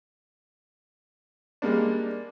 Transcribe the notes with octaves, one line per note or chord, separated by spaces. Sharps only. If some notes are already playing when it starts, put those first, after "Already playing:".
G3 G#3 A#3 D4